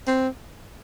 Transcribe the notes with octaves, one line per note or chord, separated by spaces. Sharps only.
C4